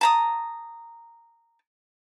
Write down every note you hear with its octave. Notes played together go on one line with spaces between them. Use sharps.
A5 A#5 D#6